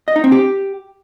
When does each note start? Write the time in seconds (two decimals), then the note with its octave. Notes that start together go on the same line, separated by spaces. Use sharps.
0.08 D#5
0.16 D#4
0.24 C4
0.32 G4